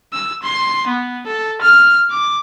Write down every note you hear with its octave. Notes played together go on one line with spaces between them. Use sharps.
E6
C6
B3
A4
F6
D6